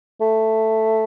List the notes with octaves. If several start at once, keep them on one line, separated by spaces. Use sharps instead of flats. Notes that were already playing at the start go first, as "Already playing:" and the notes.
A3